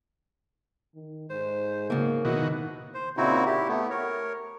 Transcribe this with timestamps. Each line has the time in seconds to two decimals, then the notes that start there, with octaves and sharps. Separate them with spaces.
0.95 D#3
1.30 G#2 C5
1.90 C#3 F#3 A#3
2.25 B2 D#3 D#4 E4 F#4
2.94 C5
3.17 A#2 C#3 C4 D#4 E4 F#4
3.46 E4 G4
3.68 A3 B3
3.90 A#4 C#5